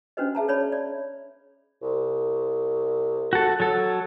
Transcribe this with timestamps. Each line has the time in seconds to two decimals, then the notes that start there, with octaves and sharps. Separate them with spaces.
0.17 C#4 D4 F#4 B4 C5 D#5
0.35 G#4 E5 A5 A#5
0.48 C#5 D5 B5
0.72 D5
1.82 C2
3.33 F#4 A4
3.60 F#3 A4